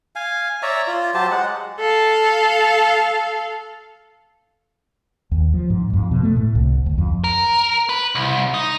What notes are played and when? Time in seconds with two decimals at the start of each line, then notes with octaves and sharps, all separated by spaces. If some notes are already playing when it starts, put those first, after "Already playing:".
0.16 F5 G#5
0.63 C#5 D5 E5 A#5
0.88 F4
1.14 F#3 G4 C5 A5
1.31 G#3 F#5
1.80 A4 F5
5.31 D#2
5.54 F3
5.70 G#2
5.93 F2
6.11 B2
6.23 A3
6.37 A2
6.55 C2
6.86 D2
6.98 F2
7.24 A#4
7.89 B4
8.15 C2
8.54 D#4